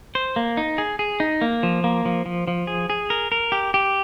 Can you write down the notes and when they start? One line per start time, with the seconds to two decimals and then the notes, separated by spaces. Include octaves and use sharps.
0.15 C5
0.36 A#3
0.57 D#4
0.78 G#4
0.99 G#4
1.20 D#4
1.41 A#3
1.63 F3
1.84 A#3
2.05 F3
2.26 F3
2.48 F3
2.67 G#4
2.90 G#4
3.10 A#4
3.32 A#4
3.52 G4
3.74 G4